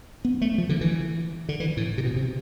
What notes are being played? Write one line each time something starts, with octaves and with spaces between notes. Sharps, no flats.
B3
A3
F3
D3
E3
D3
E3
A2
C3
B2
C3